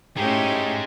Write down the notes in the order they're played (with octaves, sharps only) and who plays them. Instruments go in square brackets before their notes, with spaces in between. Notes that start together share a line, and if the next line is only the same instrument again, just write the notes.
[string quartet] A2 A3 C#4 [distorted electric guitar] G#3 D#4 [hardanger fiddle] G4